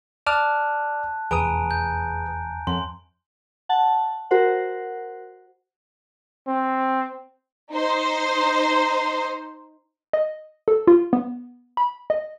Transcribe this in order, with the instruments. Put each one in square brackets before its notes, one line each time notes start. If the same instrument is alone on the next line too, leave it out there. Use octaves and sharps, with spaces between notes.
[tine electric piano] D5 D6 F6 [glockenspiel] A5 F#6
[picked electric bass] F1 E2 [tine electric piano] G#4 B4 D#6 [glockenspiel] G#5 A#5 D7
[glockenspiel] G6
[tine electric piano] F2 [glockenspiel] C6
[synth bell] F#5 A5
F#4 A#4 C5 F#5
[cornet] C4
[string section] D#4 C5
[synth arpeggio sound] D#5
A4
F4
B3
B5
D#5